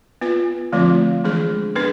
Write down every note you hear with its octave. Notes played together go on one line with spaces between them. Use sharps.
B3 F4 B4
D3 F3 A3 C4 F4
E3 G#3 D4 G#4
B3 D4 G#4 B4